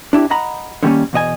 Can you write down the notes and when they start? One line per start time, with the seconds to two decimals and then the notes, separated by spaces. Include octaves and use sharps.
0.13 D4 E4 G4
0.30 D#5 F#5 A#5 B5
0.83 D3 D#3 G3 A#3 C#4
1.13 E2 B2 D#5 G#5